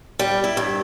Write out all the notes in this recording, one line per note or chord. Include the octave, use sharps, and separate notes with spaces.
G3
E4
G2